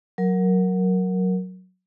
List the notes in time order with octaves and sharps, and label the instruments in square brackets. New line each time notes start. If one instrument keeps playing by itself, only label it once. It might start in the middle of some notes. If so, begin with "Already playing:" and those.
[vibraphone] F#3 A#4